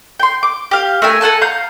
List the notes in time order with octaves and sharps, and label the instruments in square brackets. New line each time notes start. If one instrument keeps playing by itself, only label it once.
[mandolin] G5 C6
D6
G4 F5
A3 A#4 E5 G#5
A4 F#5 G#5 A5
F5 A#5 G6